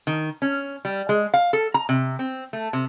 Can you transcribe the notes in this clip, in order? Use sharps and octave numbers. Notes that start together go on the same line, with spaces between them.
D#3
C#4
G3
G#3
F5
A4
A#5
C3
C4
A3
C3